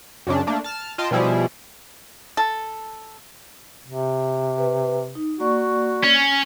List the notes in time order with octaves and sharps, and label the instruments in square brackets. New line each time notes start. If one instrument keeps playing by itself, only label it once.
[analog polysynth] F#2 C#3 D4
A3 A#3 D4
A5 F6
F4 D#5 G5 A5 C6
B2 F3 G3 E4 G#4
[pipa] A4
[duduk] C3
[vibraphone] B4
D#4
[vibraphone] A#3 D5 C#6 [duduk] F#4
[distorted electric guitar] C#4